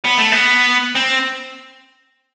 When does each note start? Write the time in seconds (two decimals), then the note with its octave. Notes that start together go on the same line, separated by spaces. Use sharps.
0.05 B3
0.18 A3
0.32 B3
0.95 C4